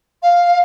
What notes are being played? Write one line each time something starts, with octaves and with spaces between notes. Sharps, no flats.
F5